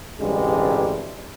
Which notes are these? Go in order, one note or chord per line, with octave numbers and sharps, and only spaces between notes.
A1 D2 G2 C3 G3 G#3